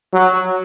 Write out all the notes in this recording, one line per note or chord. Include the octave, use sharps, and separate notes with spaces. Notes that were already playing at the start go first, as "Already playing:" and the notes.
F#3